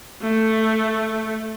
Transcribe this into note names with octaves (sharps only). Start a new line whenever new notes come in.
A3